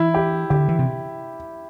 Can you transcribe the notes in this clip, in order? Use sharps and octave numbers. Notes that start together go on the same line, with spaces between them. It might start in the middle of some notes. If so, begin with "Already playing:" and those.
Already playing: E3 E4
G4
D3 G4
E3
C3